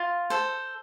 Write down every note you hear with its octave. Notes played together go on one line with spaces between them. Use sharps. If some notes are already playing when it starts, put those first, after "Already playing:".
Already playing: F4
A4 C5